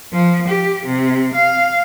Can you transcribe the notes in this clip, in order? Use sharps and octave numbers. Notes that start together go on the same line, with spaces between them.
F3
G4
C3
F5